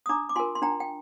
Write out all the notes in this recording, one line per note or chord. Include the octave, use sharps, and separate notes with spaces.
D#6
D4 A#5 D6
D6
F4 A#4 G#5 C6
C6
D4 G5 A#5
G5